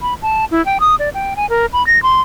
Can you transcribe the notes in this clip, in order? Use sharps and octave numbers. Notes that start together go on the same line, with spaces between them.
B5
A5
E4
G5
D#6
D5
G5
G#5
A#4
B5
A#6
C6